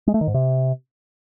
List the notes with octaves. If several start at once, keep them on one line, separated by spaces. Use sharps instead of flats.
G#3
A3
D#3
G#2
C3